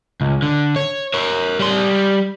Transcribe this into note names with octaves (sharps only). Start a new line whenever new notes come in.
C#2
D3
C#5
A#4 C#5
G3 C6